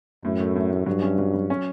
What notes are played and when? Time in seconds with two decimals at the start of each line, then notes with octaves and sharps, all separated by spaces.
0.24 F#2 A2
0.40 A3
0.56 A2
0.71 A2
0.86 G2 F#3
1.02 C#4
1.19 F#3
1.34 F#3
1.50 C#4